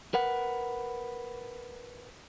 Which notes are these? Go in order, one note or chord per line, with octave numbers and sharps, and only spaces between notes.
A#4 B4 F#5